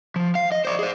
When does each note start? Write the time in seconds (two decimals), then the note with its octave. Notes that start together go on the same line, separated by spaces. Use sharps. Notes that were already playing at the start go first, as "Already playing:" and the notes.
0.16 F3
0.35 F5
0.52 D#5
0.65 C5 D5
0.79 G#4 C5